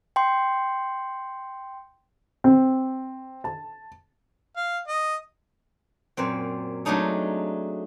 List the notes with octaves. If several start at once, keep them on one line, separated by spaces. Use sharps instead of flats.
G5 C6
C4
A5
F5
D#5
F#2 A#2 C4
F#3 G#3 A3 D4 D#4 A4